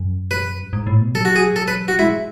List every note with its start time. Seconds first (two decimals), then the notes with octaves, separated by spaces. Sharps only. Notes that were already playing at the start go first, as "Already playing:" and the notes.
Already playing: F#2
0.31 B4
0.73 G#2
0.87 A2
1.01 B2
1.15 F#3 A4
1.25 F#4
1.36 G#4
1.56 A4
1.68 B4
1.88 F#4
1.99 G#3 E4